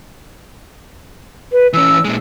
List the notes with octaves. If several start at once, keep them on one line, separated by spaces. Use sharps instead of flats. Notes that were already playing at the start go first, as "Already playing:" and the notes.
B4
E3 C#4 E6
A#2 G#3